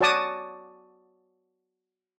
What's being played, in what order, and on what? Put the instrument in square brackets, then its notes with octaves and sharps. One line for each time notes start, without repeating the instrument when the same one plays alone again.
[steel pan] F#4 C#5 D5 A5 D6 D#6